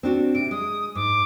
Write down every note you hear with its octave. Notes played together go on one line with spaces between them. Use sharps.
C4 D4 F#4
C3 D7
G#3 D#6
G#2 D6